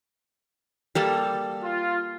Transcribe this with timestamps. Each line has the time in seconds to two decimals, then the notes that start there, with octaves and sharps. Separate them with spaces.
0.95 G3 A#3 A4
1.63 F4